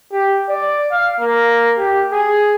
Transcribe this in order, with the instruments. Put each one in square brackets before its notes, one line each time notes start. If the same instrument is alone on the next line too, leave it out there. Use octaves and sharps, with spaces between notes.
[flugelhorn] G4
D5
F5
A#3
G4
G#4